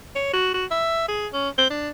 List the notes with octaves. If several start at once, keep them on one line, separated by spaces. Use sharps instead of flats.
C#5
F#4
F#4
E5
G#4
C#4
C4
D4